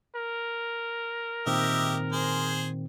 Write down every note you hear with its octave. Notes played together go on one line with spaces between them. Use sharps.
A#4
A#2 D#3 C4 G4 D#5 E5
G#4 C5